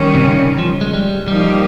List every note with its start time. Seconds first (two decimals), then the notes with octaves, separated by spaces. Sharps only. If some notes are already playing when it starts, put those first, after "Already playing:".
Already playing: D#3 G3 C#4
0.15 C3
0.24 C#3
0.59 F3
0.81 G#3
0.94 G3
1.27 F3 G3 A#3 D#4 G4